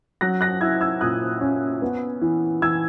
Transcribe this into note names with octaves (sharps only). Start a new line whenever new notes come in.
F#3 F#6 A#6
F#6 A#6
E4 E6 G#6
E6 G#6
A#2 D#6 F#6
C#4
B3
E3
E3 E6 G#6